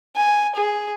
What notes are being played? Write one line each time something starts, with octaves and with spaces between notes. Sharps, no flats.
G#5
G#4